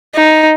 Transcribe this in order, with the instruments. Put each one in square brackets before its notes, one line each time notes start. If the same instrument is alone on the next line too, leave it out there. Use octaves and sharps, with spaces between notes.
[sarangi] D#4